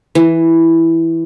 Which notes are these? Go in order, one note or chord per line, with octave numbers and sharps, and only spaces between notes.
E3